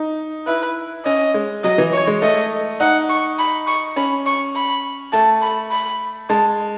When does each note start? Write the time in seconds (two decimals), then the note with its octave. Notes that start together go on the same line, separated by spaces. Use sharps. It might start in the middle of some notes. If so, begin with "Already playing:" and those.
Already playing: D#4
0.47 E4 B4
1.05 C#4 D#5
1.34 G#3
1.64 F#3 D#5
1.78 E3
1.93 C#5
2.07 G#3
2.22 A3 D#5
2.80 D#4 F#5
3.09 C#6
3.39 B5
3.67 C#6
3.96 C#4 B5
4.26 C#6
4.55 B5
5.12 A3 A5
5.42 B5
5.71 B5
6.30 G#3 A5